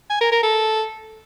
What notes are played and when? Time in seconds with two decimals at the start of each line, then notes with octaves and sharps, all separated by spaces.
0.10 G#5
0.21 A#4
0.32 A#4
0.43 A4